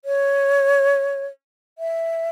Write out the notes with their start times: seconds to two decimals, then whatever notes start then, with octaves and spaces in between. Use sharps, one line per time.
0.05 C#5
1.78 E5